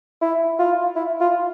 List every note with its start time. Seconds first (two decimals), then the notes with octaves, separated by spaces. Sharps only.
0.21 E4
0.59 F4
0.96 E4
1.21 F4